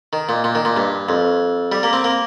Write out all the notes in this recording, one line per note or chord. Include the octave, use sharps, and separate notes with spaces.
D#3
A#2
A#2
D#3
A#2
G2
F2
G3
A#3
C4
A#3